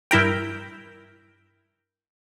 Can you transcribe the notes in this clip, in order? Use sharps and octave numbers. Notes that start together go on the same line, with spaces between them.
G2 E4 A#4 G5